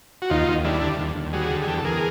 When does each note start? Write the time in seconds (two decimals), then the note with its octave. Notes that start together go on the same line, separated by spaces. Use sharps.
0.22 F#4
0.30 D#2 D#4 F4
0.48 D#2
0.64 G3 D4 E4
0.82 D3
0.99 D#2
1.16 D#2
1.33 G3 F#4 G#4
1.50 D3
1.62 G#4
1.67 E2 G4 A4
1.78 A4
1.85 E2 G#4 A#4